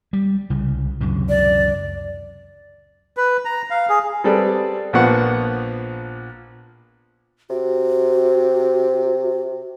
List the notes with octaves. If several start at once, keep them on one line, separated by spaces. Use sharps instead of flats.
G3
C2 C#3
C#2 F#2 C3
D5
B4
A#5
F5
G#4
G3 C4 G#4 A4 B4 D5
A#1 F3 A#3 B3 F#5 C#6
C3 F#4